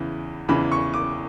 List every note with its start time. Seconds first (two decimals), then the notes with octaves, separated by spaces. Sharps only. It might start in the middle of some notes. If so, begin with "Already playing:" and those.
Already playing: E2 C#3 E3
0.48 E2 C#3 E3 B5
0.72 C#6
0.94 D6